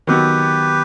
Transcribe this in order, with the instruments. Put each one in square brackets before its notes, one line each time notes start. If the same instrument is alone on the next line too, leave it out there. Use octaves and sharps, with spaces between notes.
[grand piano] D#3 F#3 B3 [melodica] G4 B4